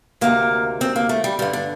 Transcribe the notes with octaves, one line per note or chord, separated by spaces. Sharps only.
D2 C3 D#3 A#3
C4
A#3
A3
G3
G2 D3 G3
D4